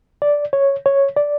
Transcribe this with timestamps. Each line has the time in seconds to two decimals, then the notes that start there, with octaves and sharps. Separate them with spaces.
0.22 D5
0.53 C#5
0.86 C#5
1.16 D5